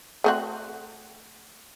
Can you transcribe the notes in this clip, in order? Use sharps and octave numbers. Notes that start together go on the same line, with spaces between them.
A3 C4 F#4